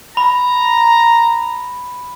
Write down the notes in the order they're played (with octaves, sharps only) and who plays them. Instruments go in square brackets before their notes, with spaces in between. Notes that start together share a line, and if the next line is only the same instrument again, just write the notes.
[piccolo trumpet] A#5 [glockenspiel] B5